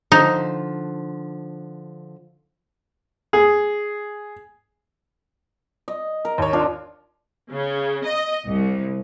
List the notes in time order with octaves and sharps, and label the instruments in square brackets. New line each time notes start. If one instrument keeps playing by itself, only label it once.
[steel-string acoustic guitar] D3 F3 [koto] D#4
[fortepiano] G#4
[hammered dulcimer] D#5
A#4
[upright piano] D#2 C#5
[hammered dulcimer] D4 F4
[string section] C#3
D#5
C2